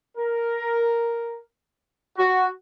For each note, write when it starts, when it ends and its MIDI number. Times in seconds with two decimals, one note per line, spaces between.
0.16 1.38 70
2.17 2.45 66